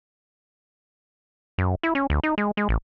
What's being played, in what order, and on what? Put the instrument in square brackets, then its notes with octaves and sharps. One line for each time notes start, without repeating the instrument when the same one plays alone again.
[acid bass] F#2
E4
C#4
D2
D#4
G#3
G#3
A1